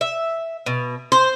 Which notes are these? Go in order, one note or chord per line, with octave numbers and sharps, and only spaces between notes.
E5
B2
C5